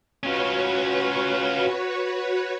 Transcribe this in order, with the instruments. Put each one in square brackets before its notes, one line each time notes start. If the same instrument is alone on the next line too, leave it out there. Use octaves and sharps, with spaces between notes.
[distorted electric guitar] C#4 F4 [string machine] F#4 B4 C#5